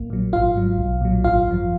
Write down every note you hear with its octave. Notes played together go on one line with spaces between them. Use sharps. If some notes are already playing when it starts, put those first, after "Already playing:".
Already playing: A#1 A#3
A#2 F#3
G#1 F4 F5
G#2 F#3
B1
A#2 F#3
G#1 F4 F5
F#2 F3